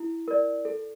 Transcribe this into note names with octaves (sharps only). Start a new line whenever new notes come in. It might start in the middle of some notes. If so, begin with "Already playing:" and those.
Already playing: E4
A#4 D5
A4